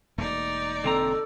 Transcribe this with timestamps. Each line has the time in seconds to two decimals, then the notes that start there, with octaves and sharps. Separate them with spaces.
0.18 E1 A3 A#3 D#4 D5
0.84 D2 C4 A4 A#5